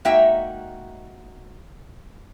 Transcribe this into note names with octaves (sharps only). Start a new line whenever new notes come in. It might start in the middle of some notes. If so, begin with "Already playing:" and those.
G#3 A#3 D#4 F#4 E5 G5